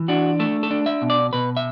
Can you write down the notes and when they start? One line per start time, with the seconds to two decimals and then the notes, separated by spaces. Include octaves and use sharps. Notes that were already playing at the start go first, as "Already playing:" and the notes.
Already playing: E3
0.08 D4 F#4
0.40 A3 A4
0.63 A4
0.71 D4
0.86 E5
1.02 B2
1.10 D5
1.33 B2 B4
1.57 E5